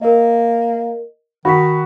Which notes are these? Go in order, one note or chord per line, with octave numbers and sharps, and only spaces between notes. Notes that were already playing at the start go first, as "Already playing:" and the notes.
A#3 A#4 D#5
D#3 F#4 B5 B6